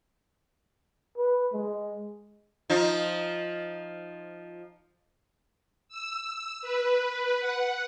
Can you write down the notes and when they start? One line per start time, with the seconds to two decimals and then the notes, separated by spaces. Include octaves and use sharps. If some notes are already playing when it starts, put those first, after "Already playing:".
1.17 B4
1.53 G#3
2.70 F3 D#4 F4
5.89 E6
6.62 B4
7.40 F#5